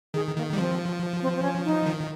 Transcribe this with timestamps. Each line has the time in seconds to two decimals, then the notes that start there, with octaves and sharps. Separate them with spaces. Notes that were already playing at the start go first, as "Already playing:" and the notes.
0.14 D#3 G#4
0.36 D#3 A#3
0.53 G3
0.57 F3 C4
1.22 C4
1.36 C4
1.43 C#4
1.65 D#4
1.86 D#3